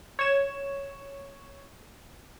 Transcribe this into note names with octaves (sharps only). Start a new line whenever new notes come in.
C#5 E7